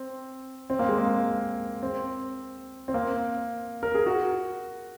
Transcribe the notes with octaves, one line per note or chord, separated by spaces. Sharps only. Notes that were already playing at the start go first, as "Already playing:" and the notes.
Already playing: C4
C4
A#3
G#3
A#3
C4
C4
A#3
A#4
G#4
F#4